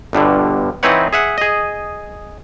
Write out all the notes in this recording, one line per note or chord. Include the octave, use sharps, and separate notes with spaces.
G1 G2 B2 D3
E3 C4 D#4 B4 C#5 F#5
G#4 E5 F#5
G#4 D#5